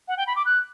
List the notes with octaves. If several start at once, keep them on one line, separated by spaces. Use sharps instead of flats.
F#5
G5
B5
D6
F#6